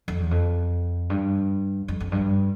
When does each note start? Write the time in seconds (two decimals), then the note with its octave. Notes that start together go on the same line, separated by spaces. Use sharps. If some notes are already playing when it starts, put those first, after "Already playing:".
0.08 F2
0.20 E2
0.31 F2
1.10 G2
1.88 F2
2.00 F2
2.12 G2